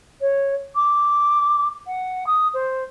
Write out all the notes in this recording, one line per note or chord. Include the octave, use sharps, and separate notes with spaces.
C#5
D6
F#5
D#6
C5